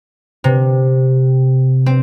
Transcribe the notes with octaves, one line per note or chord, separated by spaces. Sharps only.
C3
C4